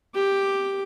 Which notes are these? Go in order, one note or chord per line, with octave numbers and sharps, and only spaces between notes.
G4 D6